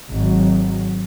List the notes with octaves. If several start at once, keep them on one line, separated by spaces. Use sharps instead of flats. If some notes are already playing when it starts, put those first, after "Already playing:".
G#1 F#3